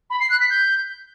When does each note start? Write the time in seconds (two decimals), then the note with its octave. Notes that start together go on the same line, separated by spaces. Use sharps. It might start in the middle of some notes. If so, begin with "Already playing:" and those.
0.10 B5
0.20 C7
0.30 F#6
0.40 B6
0.50 G6